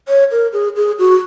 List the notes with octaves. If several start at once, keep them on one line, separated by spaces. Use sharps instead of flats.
C#5
A#4
G#4
G#4
F#4